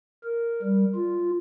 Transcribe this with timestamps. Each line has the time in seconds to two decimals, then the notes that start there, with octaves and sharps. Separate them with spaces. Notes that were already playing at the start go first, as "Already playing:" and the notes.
0.24 A#4
0.63 G3
0.95 F4